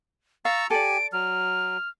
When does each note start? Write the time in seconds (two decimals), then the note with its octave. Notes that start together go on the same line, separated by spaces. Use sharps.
0.45 F5 A#5 C#6 E6 A6
0.70 G4 A4 D5 G#5 D7
1.13 F#3 F6